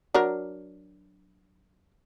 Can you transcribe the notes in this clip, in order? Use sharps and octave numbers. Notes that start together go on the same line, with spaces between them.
F#3 D4 A#4